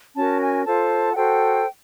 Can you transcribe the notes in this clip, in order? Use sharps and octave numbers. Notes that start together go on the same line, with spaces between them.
C#4 F#4 A#4 A5
G#5
F4 A4 C5 A5
F#5
F#4 A4 C5 G5